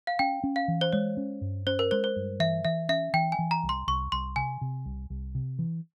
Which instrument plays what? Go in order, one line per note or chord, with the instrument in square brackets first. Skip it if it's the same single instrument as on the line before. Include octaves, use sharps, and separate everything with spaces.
[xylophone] F5
[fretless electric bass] C#4 [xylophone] G5
[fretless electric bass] C#4
[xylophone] F5
[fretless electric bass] E3
[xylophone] C5
[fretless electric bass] G#3 [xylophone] C#5
[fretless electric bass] C#4
G2
[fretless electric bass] C#4 [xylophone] C5
[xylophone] A#4
[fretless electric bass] G#3 [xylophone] C5
[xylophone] C5
[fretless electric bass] G2
[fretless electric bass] E3 [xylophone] E5
[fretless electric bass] E3 [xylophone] E5
[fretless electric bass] C#4 [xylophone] E5
[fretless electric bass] E3 [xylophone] G5
[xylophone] G#5
[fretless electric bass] E3
[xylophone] A#5
[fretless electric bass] C2
[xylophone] C6
[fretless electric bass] C2 [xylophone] C#6
[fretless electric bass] C2 [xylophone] C6
[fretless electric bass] C3 [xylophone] G#5
[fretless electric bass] C3
C2
C2
C3
E3